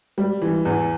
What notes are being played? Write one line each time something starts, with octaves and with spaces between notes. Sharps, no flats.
G3
E3
E2